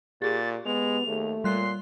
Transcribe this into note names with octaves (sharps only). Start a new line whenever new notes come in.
A#2 G4 G#4 A6
G#3 B3 F7
D#2 A3
A#2 G3 C6 F#6 C7